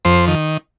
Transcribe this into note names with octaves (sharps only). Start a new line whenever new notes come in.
F2 C5
D#3